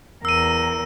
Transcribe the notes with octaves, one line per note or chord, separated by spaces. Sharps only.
E2 A#4 E6 D#7